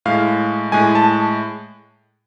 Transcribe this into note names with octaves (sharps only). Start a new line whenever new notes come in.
A2 G#3 F5
A2 G#3 G#5
A5